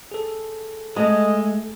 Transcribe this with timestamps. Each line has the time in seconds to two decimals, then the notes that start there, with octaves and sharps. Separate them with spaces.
0.12 G#4 A4
0.97 G#3 A3 D#5